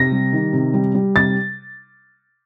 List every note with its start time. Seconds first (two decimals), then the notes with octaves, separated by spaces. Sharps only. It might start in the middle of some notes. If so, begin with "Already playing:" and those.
Already playing: C3 A#6
0.12 G3
0.33 D#3
0.53 C3
0.74 G3
0.95 G3
1.15 C3 A6